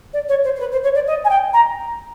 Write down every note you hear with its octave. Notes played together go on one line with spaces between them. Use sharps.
D5
C#5
C5
C5
B4
C5
C#5
D5
D#5
G#5
G5
A#5